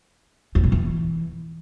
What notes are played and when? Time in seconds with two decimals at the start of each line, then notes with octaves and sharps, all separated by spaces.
0.55 E2
0.64 C3
0.72 E3